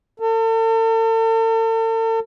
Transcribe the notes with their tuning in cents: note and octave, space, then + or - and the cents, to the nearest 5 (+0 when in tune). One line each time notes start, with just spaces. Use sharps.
A4 +40